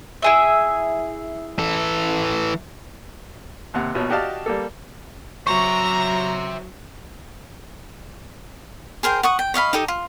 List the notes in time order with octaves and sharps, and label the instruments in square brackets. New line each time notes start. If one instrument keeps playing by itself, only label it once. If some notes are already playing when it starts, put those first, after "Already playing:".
[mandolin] E4 G#4 E5
[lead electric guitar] E3 A4
[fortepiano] D#2 C3 F#5
A#1 B2 C#5
F#4 G4 D5 D#5 F5 A5
G3 A#3 A4
[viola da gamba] F#3 [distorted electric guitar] C5 E5 [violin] A#5 [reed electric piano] C#6
[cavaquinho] G#4 A#4 C5 G5
F#5 C#6 D#6
G5
C#5 D#5 F5 B5
D#4 G4 A4 D#6
F4